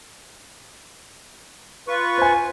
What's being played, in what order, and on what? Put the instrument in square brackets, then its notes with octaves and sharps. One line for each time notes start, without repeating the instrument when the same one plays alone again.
[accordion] F4 B4 C#6
[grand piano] C5 G#5